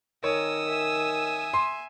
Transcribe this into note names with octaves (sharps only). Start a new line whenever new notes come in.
D#3 A#4 C#5 G#5 D#6 E6
E5 G#5
C6